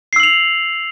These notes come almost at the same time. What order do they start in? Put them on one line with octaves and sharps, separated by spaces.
C7 E6 F#7 F7